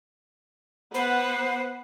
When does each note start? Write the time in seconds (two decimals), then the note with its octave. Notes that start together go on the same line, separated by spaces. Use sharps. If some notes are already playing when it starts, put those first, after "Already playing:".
0.94 B3 B4 C5 F#5